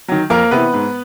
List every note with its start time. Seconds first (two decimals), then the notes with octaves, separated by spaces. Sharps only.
0.08 D#3 F#3
0.30 F2 A#3 A#4
0.51 C3 E3 B3 B4
0.73 G#2